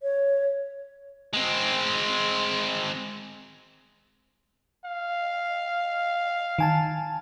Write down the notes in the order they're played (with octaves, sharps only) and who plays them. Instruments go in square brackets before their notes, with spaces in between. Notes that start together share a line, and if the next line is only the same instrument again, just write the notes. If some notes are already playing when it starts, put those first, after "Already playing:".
[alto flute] C#5
[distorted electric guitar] G#3 C4
[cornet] F5
[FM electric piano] D#3 G#5 A5